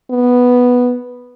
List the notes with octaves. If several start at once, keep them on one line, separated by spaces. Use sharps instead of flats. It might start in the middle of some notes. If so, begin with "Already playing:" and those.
B3